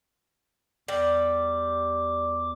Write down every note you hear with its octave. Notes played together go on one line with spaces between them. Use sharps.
E2 G3 D6